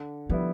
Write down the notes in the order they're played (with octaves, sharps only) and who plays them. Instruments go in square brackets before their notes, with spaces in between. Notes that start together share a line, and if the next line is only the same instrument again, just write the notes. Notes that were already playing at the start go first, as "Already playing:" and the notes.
Already playing: [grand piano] D3
[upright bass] F3 [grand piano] G3 B3 E4